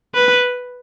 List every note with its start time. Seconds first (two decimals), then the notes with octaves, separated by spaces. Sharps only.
0.15 B4